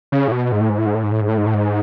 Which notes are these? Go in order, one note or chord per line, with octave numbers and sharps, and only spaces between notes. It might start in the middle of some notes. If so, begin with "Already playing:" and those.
C#3
A2
B2
G#2
A2
G#2
A2
G#2
A2
G#2
A2
G#2
A2
G#2
A2
G#2